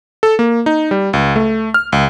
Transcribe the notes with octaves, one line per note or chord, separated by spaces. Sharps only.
A4
A#3
D#4
G3
C#2
A3
F6
C#2